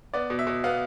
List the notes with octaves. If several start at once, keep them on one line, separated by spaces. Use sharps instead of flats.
B3 D5
B2
E5
B2
B3 F5